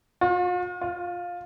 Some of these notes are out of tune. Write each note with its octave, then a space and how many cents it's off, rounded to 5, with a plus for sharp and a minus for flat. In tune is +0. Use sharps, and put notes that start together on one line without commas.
F4 +45
F4 +15